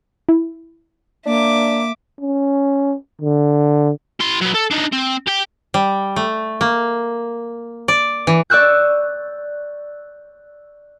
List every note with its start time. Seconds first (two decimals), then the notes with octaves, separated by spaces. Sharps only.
0.29 E4
1.26 A#3 D4 E5 D6
2.20 C#4
3.21 D3
4.20 E4 C6
4.42 F#3 B3
4.55 A4
4.71 D4 D#4
4.92 C4
5.27 G4 G5
5.74 G3
6.16 A3
6.61 A#3
7.88 D5
8.27 E3
8.50 D5 C#6 E6 F#6 G6